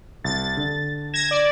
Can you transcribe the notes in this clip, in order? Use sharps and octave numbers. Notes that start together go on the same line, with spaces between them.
C2 A6
D3
G#6 A#6 E7
D5